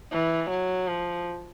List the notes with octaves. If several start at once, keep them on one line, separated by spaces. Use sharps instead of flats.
E3
F#3
F3